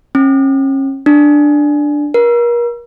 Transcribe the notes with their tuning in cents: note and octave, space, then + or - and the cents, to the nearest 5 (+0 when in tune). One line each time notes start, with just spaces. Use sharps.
C#4 -35
D4 +5
A#4 +35